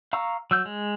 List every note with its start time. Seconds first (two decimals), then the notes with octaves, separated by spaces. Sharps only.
0.13 F5 A#5 C#6 E6
0.51 F#3 E6 G6
0.65 G#3